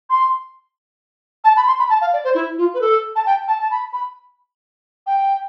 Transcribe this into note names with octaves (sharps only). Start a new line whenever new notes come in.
C6
A5
B5
C6
B5
A5
F5
D5
C5
E4
F4
B4
A4
A5
G5
A5
A5
B5
B5
G5